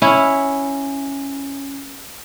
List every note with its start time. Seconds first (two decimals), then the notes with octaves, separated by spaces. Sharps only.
0.02 C#4 E4